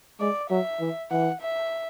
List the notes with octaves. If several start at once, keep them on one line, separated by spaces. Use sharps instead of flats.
G#3 D5
F#3 E5
E3
E3 F#5
E5